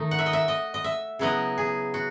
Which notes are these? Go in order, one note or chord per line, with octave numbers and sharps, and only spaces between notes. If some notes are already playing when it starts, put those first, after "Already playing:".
Already playing: D#3 A3 D#4
F#5
E5
D#5
E5
D#5
D#5
E5
C#3 F#3 B3 E4 D#5
G#4
F#4